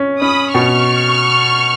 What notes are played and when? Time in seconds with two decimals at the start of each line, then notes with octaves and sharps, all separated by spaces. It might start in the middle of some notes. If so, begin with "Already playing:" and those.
Already playing: C#4
0.21 C#4 B5 D#6
0.54 B2 C#6 F6